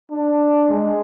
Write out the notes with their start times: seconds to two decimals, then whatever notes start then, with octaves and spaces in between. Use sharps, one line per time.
0.11 D4
0.69 G#3